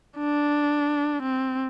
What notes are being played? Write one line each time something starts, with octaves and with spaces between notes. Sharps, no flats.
D4
C4